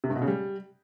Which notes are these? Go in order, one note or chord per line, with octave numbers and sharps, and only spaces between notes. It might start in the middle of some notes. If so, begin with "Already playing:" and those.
C3
G2
B2
C#3
G3